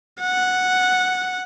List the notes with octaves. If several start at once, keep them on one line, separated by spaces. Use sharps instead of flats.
F#5